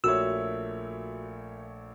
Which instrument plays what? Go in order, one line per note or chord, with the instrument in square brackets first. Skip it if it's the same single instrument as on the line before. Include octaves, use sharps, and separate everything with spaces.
[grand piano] A#1 A3 C#5 [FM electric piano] F#4 [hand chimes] A#4 E5 [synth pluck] E6